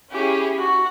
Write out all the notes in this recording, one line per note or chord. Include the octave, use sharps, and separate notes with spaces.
C#4 E4 G4 G#4
F#4